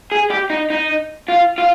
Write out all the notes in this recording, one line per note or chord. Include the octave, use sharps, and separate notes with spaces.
G#4
G4
D#4
D#4
F4
F4